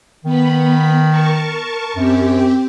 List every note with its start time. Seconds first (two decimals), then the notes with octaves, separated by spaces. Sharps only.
0.25 D#3 B3 B5
1.08 A#4 A5 C#6
1.96 F#2 C4 G4